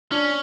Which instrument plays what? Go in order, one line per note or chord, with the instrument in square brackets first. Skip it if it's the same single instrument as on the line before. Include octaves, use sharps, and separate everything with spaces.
[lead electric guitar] C#4 [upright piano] D4